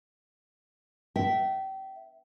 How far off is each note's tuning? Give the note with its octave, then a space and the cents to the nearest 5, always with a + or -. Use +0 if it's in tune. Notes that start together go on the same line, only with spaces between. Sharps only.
E5 +0 G5 -30